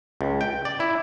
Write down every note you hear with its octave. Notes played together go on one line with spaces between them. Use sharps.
C#2
G5
D5
E4